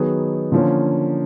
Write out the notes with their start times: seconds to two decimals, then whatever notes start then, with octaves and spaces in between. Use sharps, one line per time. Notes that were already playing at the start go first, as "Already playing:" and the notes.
Already playing: D#3 F#3 B3 D#4 G#4
0.52 D3 F3 A#3 C#4